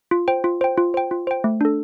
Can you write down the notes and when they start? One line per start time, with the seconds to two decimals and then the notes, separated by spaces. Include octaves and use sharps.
0.11 F4
0.28 C5 G5
0.44 F4
0.61 C5 G5
0.77 F4
0.94 C5 G5
1.11 F4
1.27 C5 G5
1.44 A3
1.61 D4 A4